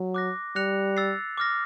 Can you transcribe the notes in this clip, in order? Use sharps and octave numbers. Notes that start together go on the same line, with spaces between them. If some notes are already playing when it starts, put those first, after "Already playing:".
Already playing: F#3
D6 F#6 A#6
G3 F#6 A#6 C#7 F7
E6 A6 C7
D6 F6 A#6